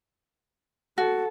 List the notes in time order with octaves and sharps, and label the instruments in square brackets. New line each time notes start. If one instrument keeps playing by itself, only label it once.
[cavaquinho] F#4 [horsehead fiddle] A4